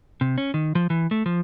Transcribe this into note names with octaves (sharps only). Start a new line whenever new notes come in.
C3
C#4
D#3
F3
E3
A3
F3